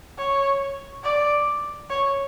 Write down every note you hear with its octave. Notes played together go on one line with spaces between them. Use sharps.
C#5
D5
C#5